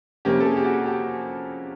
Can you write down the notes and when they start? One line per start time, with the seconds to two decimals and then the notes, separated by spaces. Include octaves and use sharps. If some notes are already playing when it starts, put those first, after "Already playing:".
0.25 F2 C3 F3 A#3 C#4 G4
0.40 A4
0.46 G#4
0.57 G4
0.65 F#4
0.86 G4